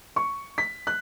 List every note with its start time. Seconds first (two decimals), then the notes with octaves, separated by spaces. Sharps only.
0.16 C#6
0.58 B6
0.87 F#6